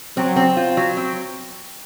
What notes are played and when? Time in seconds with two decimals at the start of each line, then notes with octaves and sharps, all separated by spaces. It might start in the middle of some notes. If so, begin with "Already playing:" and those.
0.17 F#3 C4
0.36 C4
0.57 F4
0.77 F#3
0.97 C4